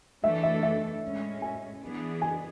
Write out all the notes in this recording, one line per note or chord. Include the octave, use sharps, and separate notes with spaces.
E3 A3 D4 A4 E5
E5
E5
A2 G#3 C#4
G#5
E3 B3 D4 G#4
G#5